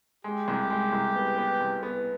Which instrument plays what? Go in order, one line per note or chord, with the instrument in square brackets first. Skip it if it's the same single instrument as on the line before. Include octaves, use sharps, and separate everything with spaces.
[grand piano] G#3 [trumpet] G4
[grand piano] C2
G#3
C2
B3
B3
C2
B3